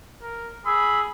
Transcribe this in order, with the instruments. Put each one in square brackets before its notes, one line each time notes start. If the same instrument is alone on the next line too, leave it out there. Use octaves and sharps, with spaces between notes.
[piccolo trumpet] A#4
[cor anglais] G#4 [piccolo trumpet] B5 [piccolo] E6